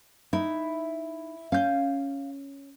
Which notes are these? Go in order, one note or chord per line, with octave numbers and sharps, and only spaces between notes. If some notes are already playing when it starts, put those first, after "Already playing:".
D#4 E4
C#4 F5 G6